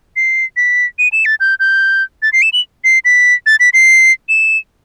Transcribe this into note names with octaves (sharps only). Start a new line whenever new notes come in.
C7
B6
D#7
E7
A6
G6
G6
A6
C7
E7
F#7
C7
B6
A6
B6
C7
E7